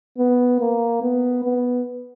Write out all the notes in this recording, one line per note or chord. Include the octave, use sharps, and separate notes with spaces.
B3
A#3
B3
B3